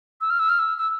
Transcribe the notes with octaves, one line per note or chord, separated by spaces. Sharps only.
E6
F6
E6
F6
E6
E6